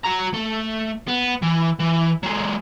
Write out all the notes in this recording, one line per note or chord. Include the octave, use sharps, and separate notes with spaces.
F#4 A#5
A3
B3
E3
E3
F#3 G#3